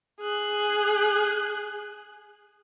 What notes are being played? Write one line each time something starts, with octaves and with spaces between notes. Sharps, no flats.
G#4 F#6